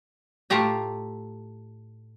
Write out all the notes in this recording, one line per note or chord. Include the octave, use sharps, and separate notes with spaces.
A2 A3 F4 G4 A#5